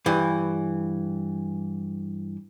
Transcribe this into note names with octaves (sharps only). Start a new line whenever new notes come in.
G2 E3